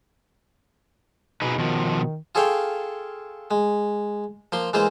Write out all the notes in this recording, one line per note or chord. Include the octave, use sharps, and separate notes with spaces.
B2 D#4 G#4 B4
B2 D#3 F3
F4 G#4 A4 C#5 F5 G5
G#3
F3 A#3 C6
E3 G#3 A#3 F4 C5